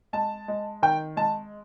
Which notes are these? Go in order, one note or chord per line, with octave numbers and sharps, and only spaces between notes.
G#3 A5
G#3
D#3 G5
G#3 A5